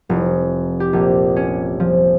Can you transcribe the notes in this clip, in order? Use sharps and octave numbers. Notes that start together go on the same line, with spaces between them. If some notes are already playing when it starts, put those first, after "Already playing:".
F1
G4
A#1
C#4
F3